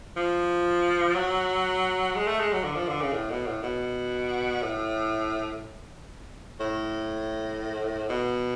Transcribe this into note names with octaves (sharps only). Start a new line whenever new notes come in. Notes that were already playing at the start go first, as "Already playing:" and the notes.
F3
F#3
G#3
A3
G#3
F#3
D3
F3
D3
C#3
A2
B2
A2
B2
A2
A2
B2